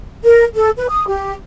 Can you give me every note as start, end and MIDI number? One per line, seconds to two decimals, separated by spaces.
0.23 0.44 70
0.55 0.70 69
0.77 0.86 71
0.89 1.05 87
1.07 1.32 67